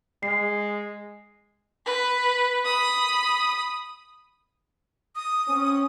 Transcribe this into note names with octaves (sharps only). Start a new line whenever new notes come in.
G#3 C7
B4
B5 D#6
D#6
C4 C#4